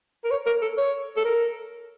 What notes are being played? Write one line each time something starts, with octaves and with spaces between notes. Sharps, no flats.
A#4
C#5
A#4
A4
C#5
A4
A#4